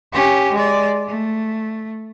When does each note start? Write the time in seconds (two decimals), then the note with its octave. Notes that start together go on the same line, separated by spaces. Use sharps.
0.12 C#4 G4
0.53 G#3 D5
1.07 A3